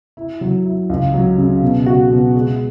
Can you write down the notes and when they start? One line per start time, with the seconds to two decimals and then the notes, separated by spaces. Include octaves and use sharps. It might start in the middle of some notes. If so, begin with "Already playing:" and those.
0.17 E4
0.41 F#3
0.66 E4
0.89 C#2
1.14 F#3
1.38 C#3
1.62 B2
1.86 F#4
2.10 B2
2.35 G#3